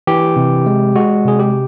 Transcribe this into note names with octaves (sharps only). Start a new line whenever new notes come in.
E3 G4
C3
G#3
G#3 F#4
C3 G#4
G4